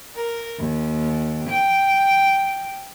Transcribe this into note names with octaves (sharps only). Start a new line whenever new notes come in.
A#4
D#2
G5